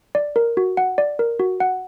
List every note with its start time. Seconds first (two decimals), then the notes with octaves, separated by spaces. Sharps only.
0.15 D5
0.36 A#4
0.57 F#4
0.77 F#5
0.98 D5
1.19 A#4
1.40 F#4
1.60 F#5